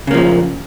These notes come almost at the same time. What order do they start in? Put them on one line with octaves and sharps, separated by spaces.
C#3 A#3 F3 A#2